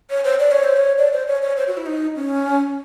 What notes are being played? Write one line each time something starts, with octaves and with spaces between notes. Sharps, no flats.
C#5
C5
D5
C#5
C5
C#5
D5
C5
C#5
C#5
C5
F#4
E4
D#4
C#4